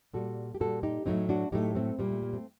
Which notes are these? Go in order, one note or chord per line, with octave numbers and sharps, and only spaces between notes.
A#2 G3 F#4 A4
G4
A#2 G3 F#4 A4
D#4 G4
A2 F#3 A3 C4 D#4
D4 F#4
A2 F#3 A3 D#4 G4
A3 C4
A#2 G3 A#3
A3
A#3
A3 C4